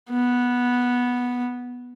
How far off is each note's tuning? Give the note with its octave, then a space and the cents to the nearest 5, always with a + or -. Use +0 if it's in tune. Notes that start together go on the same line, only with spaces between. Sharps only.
B3 -10